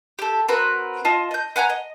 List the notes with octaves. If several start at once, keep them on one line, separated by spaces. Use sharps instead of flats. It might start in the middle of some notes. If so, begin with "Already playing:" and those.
G4 A4
C4 F#4 A#4 B4
F4 D#5 A5
D#5 G6
B4 F#5 G#5 A#5
D#5